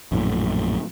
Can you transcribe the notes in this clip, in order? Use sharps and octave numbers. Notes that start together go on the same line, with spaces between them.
A#1 F#2 A2